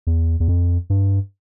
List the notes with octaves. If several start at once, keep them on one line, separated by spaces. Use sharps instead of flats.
E2
E2
F2
G2